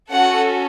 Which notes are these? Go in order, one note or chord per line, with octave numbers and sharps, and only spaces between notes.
C#4 F#4 A4 F#5